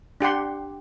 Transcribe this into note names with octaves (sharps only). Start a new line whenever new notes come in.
D4 G4 F#5 C6